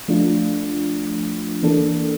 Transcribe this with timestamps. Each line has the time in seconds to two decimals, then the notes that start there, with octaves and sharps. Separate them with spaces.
0.08 F3 A3 D4 F4
1.62 E3 A#3 D4 A4